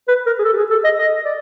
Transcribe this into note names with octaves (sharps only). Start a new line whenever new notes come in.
B4
A#4
G#4
A4
G4
G#4
A4
D#5
D#5
D5